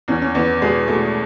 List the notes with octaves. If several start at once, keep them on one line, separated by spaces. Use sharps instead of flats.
E2 C#4
C#4
E2 B3
B2 G#3
B2 A3